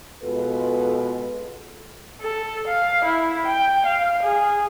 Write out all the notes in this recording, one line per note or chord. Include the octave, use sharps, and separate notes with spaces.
B2 G#3 F4 A4 B4
A4
F5
E4
G5
F5
G#4